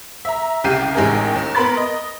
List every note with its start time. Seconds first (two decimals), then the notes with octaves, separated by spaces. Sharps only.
0.25 E5 A#5
0.64 C2 C#3 G4 G5 C7 D#7
0.94 A1 G#3 D#4 G4 A#4 G#5
1.34 D#2
1.55 B3 A#4 B5 C6 A6
1.77 D#5